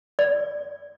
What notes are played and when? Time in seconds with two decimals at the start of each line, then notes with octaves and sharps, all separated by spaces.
0.19 D5